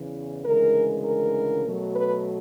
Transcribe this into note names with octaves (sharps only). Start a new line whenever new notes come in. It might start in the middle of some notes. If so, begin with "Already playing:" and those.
Already playing: E2 C#3 E3
D2 C#3 E3 G#3 A#4
A#4
B2 F#3 A3
B4